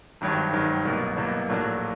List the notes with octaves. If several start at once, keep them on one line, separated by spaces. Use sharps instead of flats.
G#1 G2 D#3 F#3
G#1 G2 D#3 F#3
C2 B2 F#3 A#3
C2 B2 F#3 A#3
A#1 A2 F#3 A#3 D4